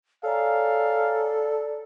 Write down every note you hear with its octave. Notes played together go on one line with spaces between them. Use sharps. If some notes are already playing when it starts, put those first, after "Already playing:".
A4 C#5 D5 F5 G#5 A#5